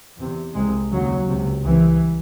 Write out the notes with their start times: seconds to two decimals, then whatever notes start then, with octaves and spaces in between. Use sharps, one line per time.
0.18 E2 C3
0.55 C2 C3 G#3
0.91 D#2 C#3 F#3
1.28 C#2 C3
1.64 C2 C3 E3